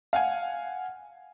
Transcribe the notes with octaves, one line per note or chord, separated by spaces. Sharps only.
F5 F#5 G#5